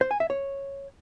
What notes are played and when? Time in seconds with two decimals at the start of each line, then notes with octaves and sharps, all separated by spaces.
0.01 C5
0.11 G#5
0.20 E5
0.30 C#5